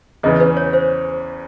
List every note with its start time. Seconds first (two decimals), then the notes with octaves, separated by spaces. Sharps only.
0.23 E2 C#3 E3 D#5
0.40 B4
0.57 C#5
0.73 C5